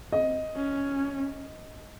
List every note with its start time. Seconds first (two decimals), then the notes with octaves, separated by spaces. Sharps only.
0.12 C4 D#5
0.56 C#4